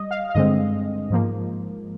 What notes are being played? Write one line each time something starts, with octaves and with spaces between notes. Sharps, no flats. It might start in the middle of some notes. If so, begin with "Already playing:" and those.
Already playing: G3 D#5
F5
F5
G2 D3 G#3 C4 D#5
G#2 F3 A#3